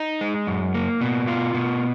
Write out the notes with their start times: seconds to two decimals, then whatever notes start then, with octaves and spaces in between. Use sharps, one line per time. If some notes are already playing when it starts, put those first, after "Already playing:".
Already playing: D#4
0.21 G#3
0.47 F#2
0.74 A#3
1.01 B2
1.27 F4
1.54 B2